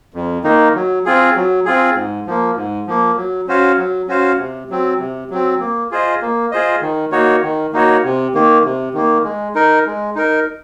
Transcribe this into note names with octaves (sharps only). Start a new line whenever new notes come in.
F2
D#3 A#3 D#4
F#3
C4 F4 G#4
F#3
C4 F4 G#4
G#2
F3 A#3
G#2
F3 A#3
F#3
C#4 F#4 C5 F5
F#3
C#4 F#4 C5 F5
C3
F#3 C4
C3
F#3 C4
A#3
F4 G#4 C5 D#5
A#3
F4 G#4 C5 D#5
D#3
A#3 D#4 F#4 C#5
D#3
A#3 D#4 F#4 C#5
C3
D#3 A#3
C3
D#3 A#3
G#3
D#4 A#4
G#3
D#4 A#4